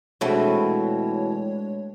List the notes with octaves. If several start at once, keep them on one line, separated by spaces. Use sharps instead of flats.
B2 E3 G#3 A3 C4 D4 C#5